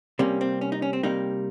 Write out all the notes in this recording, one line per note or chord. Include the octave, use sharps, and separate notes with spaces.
C3 G3 A#3 C#4
C4
C#4
D#4
C#4
C4
C3 G3 A#3 D#4